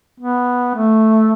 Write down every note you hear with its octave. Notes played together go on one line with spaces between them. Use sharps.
B3
A3